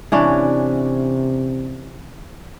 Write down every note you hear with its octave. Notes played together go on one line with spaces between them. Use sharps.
C3 E3 C#4 D4